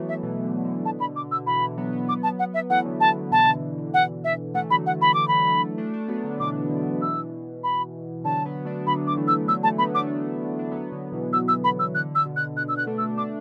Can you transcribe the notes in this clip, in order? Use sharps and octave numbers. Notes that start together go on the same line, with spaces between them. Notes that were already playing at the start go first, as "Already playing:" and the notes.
Already playing: E3 F#3 A3 B3
E5
B2 E3
D3
D3
B2 A5
D3 B5
D3 D6
D3 E6
B2 E3 B5
D3
F#3 B3
F#3 B3
D6
A5
F#5
E5
E3 A3 F#5
D3 F#3
D3 F#3 A5
D3
B2 E3 A5
D3
B2
D3
F#5
E5
E3 A3 F#5
D3 F#3 B5
D3 F#3 F#5
E3 A3 B5
D3 F#3 D6
B5
E3 A3
A3 D4
A3 D4
F#3 B3
D3 F#3
B2 E3 D6
D3
B2 E3 E6
B5
D3 F#3 A5
F#3 B3
A3 D4
D3 F#3 B5
D6
E3 A3
E6
D3 F#3 E6
E3 A3 A5
F#3 B3 B5
A3 D4 D6
D4
F#3 B3
D3 F#3
B2 E3
B2 E6
E6
B2 E3 B5
E6
D3 F#6
E6
B2
F#6
B2 F#6
E6
F#6
A3 D4
E6
A3 D4 D6